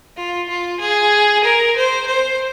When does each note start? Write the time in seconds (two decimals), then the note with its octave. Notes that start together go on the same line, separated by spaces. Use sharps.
0.16 F4
0.49 F4
0.80 G#4
1.44 A#4
1.76 C5
2.07 C5